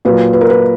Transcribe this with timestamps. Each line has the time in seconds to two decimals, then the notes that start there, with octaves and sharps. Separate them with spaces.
0.05 A#2 F#3 B4
0.33 B4
0.41 A#4
0.50 B4